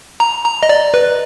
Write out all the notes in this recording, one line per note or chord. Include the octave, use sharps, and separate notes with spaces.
A#5
A#5
D#5
D5
B4